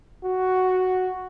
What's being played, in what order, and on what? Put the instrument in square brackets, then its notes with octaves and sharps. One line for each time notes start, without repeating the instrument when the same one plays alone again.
[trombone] F#4